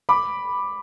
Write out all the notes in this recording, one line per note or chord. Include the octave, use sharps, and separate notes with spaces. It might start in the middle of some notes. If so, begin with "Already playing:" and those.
B5 D6